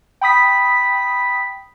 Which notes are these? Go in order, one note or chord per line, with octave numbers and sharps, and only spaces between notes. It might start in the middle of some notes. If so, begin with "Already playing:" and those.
G5 B5 D#6 B6